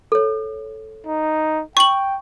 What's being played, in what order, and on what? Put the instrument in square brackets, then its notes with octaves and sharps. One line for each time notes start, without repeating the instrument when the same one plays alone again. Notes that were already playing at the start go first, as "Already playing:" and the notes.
[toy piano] A4 C#5
[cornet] D#4
[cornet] G5 [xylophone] C#6 F#7